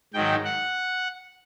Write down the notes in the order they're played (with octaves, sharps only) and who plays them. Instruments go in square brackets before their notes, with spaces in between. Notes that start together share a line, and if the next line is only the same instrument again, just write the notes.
[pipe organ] G#2 D#3 F#3 G5
F#5